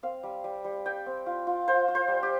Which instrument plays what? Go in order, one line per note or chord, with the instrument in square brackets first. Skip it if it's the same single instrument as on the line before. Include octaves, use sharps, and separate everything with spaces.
[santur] C4 F5
G3
G3
G3
G3 G5
C4
F4
F4
F4 C5
F4
C5
G3
G4